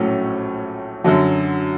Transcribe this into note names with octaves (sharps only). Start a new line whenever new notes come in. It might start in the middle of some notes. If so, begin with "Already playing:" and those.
Already playing: A#1 A2 F#3 A3 C#4
F#2 D3 F#3